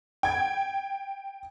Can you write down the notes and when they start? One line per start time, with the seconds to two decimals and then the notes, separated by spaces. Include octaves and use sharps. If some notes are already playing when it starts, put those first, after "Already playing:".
0.23 G5 G#6